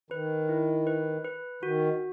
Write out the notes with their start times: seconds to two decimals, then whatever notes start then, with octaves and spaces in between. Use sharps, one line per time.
0.10 D#3 B4
0.49 E4
0.87 B4
1.25 B4
1.63 D#3 F#4